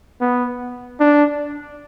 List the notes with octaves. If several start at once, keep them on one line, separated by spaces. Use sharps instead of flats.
B3
D4